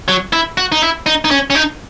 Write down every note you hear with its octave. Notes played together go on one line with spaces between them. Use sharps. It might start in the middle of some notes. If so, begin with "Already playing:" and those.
F#3
E4
F#4
D#4
E4
D#4
D#4
C#4
C#4
D#4